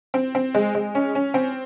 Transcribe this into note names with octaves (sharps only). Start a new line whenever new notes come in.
C4
C4
G#3
G#3
C#4
C#4
C4